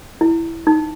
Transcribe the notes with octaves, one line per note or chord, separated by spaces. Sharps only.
E4
D#4